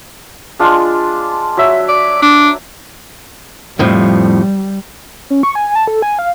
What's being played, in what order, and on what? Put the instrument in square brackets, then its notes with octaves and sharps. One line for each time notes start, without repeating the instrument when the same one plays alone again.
[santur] G#3 D4 F4
F#3 E5
[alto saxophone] D5
D4
[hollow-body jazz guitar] F2 A2 F3 [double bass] G3
[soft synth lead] C#4
C#6
G#5
A5
A4
G#5
F5